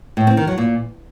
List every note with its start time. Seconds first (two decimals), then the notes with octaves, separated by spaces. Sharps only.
0.17 A2
0.27 C4
0.37 D#3
0.47 F#3
0.58 A#2